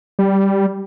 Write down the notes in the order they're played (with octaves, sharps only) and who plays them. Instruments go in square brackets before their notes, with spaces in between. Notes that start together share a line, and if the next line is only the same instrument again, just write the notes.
[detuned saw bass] G3